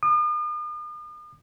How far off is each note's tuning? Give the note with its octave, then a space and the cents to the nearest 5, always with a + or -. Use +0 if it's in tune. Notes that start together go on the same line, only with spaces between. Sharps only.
D#6 -45